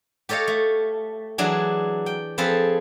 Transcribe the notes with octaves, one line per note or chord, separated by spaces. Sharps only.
G4 A4 C#5 D#5 F5
A3
E3 F#3 D4 G#4
G5
F3 C4 G#4 A4 B4